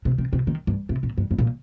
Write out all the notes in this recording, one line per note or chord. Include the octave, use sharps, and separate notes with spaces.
C3
C3
C3
D#3
G2
C3
A#2
G2
G2
A#2